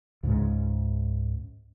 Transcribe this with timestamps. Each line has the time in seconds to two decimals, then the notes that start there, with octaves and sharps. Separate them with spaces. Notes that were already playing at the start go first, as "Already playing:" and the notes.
0.23 C#2 G#2 C#3 G#3